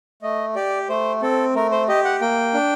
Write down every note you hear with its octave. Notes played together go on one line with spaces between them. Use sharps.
A3 D#5
G4 D5
A3 C5
C4 A4
A3 A#4
C5
G4 D#5
F#5
A#3 G5
D4